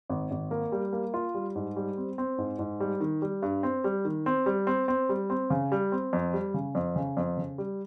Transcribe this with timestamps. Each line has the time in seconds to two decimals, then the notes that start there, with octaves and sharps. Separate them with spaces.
0.10 G#1
0.31 G#1
0.51 A#3
0.72 G3
0.93 A#3
1.14 F4
1.35 G3
1.56 G#2
1.76 G3
1.97 C4
2.18 C4
2.38 G#2
2.59 G#2
2.80 G3
3.00 D#3
3.22 G3
3.42 G2
3.63 C4
3.84 G3
4.05 D#3
4.26 C4
4.46 G3
4.67 C4
4.88 C4
5.09 G3
5.30 C4
5.50 C#3
5.72 G3
5.92 C4
6.13 F2
6.33 G3
6.54 C#3
6.75 F2
6.96 C#3
7.17 F2
7.37 C#3
7.58 G3